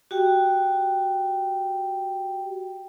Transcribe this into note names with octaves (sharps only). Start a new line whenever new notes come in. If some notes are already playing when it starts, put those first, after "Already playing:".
F#4 G4 G5